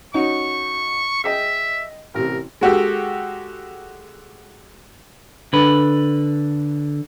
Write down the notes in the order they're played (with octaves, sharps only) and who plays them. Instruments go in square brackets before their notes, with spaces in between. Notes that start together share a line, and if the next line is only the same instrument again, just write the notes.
[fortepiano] C#4 D#4 F#4 [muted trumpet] C#6
[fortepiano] G#4 D#5 G5 [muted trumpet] E5
[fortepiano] A1 C3 [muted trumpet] A#4
[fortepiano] G#3 F#4 G4 A4
[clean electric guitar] D3 B4